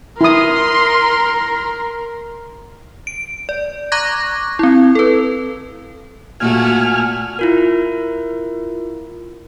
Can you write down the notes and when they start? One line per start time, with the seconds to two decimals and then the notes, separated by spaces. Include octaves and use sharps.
0.21 E4 A#4 C6 D#6
3.07 D7
3.49 D5
3.92 A#5 C#6 D6 F#6 G#6 A#6
4.59 C4 E4
4.95 A4 B4
6.40 A#2 A3 F#4 G#5 F6
7.39 E4 F4 A#4